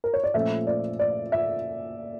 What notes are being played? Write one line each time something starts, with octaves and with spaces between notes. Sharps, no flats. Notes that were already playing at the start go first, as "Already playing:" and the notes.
A#4
C#5
D5
A#2 F3 A3 C#4 E5
D5
D5
E5